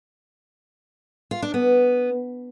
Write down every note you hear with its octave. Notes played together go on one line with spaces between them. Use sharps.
F4
D4
B3